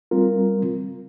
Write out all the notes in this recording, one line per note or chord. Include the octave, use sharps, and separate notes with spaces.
G3 C4 F4 A#4